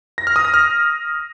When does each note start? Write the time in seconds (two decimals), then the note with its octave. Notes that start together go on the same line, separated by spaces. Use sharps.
0.18 A#6
0.27 F6
0.36 D#6
0.45 A#6
0.54 F6